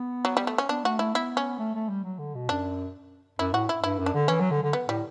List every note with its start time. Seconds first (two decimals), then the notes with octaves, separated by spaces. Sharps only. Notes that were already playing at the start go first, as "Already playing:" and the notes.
Already playing: B3
0.25 F#3
0.37 G3
0.47 A3
0.58 C#4
0.69 B3 D4
0.84 A3 F#4
0.99 A3 E4
1.14 B3 E4
1.37 C#4
1.59 A3
1.75 A3
1.89 G3
2.04 F#3
2.19 D3
2.35 B2
2.49 F#2 D4
3.39 F#2 E4
3.53 A2 F#4
3.69 E4
3.83 G2 E4
3.99 F#2
4.06 D4
4.14 D3
4.28 E3 C#4
4.40 F#3
4.51 D3
4.63 D3
4.73 B3
4.88 A2 G3